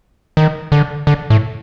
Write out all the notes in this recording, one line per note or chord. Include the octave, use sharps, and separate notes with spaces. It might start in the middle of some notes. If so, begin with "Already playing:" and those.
D#3
D3
D3
A2